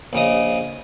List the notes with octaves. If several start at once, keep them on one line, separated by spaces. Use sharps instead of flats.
A#1 C#3 D#5